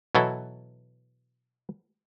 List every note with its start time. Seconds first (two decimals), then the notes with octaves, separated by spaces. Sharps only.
0.15 B2 E3 F#3 E4 A4